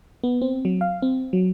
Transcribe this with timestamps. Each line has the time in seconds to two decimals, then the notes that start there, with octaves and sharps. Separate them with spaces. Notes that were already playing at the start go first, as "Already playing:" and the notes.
0.23 B3
0.41 C4
0.65 F#3
0.81 F5
1.02 C4
1.33 F#3